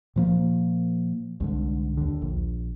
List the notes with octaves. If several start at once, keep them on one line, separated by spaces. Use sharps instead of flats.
A#2 F3 A#3
C2 G#2 D3
D#2 D3
A#1